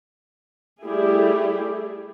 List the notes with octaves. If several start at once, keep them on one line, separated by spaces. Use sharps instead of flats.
G3 A3 E4 G4 G#4